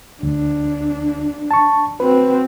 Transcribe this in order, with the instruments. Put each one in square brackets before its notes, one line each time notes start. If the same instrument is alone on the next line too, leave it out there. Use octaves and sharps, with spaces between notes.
[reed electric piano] D2 [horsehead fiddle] D4
[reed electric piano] A5 C#6
[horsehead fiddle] C4 F#4 [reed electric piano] B4